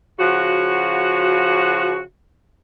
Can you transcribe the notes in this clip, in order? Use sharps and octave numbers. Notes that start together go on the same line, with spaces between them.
C#3 F3 F#4